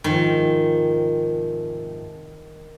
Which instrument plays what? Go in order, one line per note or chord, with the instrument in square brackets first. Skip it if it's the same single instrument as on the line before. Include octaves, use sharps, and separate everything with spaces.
[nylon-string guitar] G#2 C3 F3 [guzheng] D#3